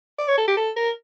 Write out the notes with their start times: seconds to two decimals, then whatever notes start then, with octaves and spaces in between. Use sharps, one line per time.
0.18 D5
0.28 C#5
0.37 A4
0.47 G4
0.57 A4
0.76 A#4